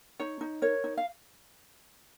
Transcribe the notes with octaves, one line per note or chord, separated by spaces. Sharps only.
D#4 C#5
D#4
A#4 C#5
D#4
F5